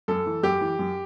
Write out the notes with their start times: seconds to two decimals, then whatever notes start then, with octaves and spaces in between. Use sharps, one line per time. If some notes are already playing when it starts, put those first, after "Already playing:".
0.08 F#2 A4
0.26 E3
0.43 F#2 G4
0.61 E3
0.79 F#2